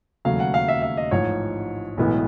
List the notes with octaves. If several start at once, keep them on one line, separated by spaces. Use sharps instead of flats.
E1 D#2 C#3 F#3 A3 F5
F#5
F5
E5
E5
D#5
A1 G#2 F3 C#5
B1 A2 E3 G#3 B3